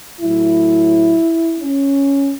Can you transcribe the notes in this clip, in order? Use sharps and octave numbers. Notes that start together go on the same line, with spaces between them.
A2 F#3 E4
C#4